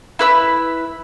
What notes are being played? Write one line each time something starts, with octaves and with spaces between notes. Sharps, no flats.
E4 B4 E6